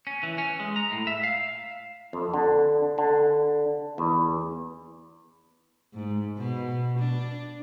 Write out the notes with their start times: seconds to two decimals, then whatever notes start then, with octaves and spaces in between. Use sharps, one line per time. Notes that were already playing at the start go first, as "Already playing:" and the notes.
0.07 C#4
0.23 E3
0.38 C#4
0.60 G#3
0.76 A#5
0.92 A2
1.07 E5
1.23 F5
2.13 F2
2.34 D3
2.98 D3
3.98 E2
5.94 G#2
6.38 B2
6.99 D4